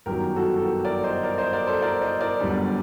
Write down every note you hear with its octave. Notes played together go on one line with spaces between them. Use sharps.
G1 F#2 D#3 F#3 G4 A#4
F#4 A4
A4
G4 A#4
A#4 D5
C5 D#5
A#4 D5
C5 D#5
A#4 D5
A4 C5
A#4 D5
C5 D#5
A#4 D5
G1 F#2 D3 G3